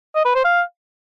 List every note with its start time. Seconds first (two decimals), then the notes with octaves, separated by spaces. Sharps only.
0.16 D#5
0.25 B4
0.35 C5
0.45 F5